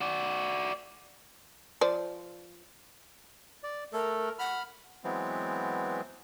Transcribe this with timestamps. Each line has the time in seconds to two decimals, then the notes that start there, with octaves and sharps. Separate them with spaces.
0.01 F#4 D5
1.81 F3 C5 D5
3.64 D5
3.93 A3 A4 A#4
4.39 F#5 B5 F6
5.04 E3 F#3 G#3 B3 C4